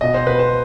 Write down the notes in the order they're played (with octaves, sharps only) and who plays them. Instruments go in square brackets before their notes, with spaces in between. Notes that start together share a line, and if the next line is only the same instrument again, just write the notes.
[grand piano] B2 D#5
C5
B2 B4
C5